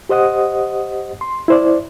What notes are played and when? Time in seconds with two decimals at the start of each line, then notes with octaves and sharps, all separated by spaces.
0.09 G4 C5 D#5 F#5 D#6
1.21 C6
1.48 E4 C5 D5